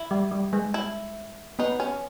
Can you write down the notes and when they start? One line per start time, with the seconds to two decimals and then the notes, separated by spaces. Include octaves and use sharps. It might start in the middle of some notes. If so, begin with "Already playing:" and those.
Already playing: E4
0.11 G3
0.31 G3
0.53 G#3
0.74 E4
1.59 B3 D#4
1.80 C#4